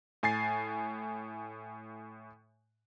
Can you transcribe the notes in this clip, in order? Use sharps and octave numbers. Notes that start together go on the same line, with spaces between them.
A2 G#5 A6 C7